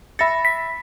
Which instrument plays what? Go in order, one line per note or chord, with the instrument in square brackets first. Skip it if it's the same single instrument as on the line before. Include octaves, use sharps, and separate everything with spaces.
[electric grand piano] E5 A6 [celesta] B5 A#6 C#7
[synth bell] B6